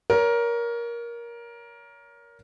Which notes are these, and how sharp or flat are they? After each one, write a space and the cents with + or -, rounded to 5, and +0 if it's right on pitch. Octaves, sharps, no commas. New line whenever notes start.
A#4 +15 C#5 +35